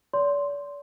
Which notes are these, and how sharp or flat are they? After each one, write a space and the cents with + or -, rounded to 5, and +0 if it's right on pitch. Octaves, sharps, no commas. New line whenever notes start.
D5 -45 C6 +0